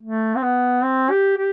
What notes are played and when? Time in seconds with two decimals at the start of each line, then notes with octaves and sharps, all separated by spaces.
0.03 A3
0.36 C4
0.43 B3
0.84 C4
1.11 G4
1.37 G4